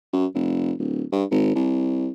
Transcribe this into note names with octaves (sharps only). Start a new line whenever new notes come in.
F#2
F1
D1
G2
G#1
C2